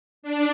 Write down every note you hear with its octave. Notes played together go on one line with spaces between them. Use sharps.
D4